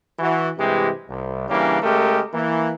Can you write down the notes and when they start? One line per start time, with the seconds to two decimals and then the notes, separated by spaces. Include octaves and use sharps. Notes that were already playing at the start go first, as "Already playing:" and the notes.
0.19 E3 F#4
0.59 G2 C3 E3 G#3 G4
1.08 C2
1.49 C#3 E3 G3 A#3 C#4 D4
1.82 C#3 G#3 A3 G4 A#4
2.33 E3 A#3